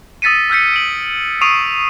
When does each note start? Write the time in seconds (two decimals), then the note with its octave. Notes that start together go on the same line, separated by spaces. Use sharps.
0.22 D#6 E6 A6 B6 C#7 D#7
0.50 E6 F6 G6 B6 C#7
0.74 D7 F#7
1.41 C#6 D#6 C7 D7 D#7 F7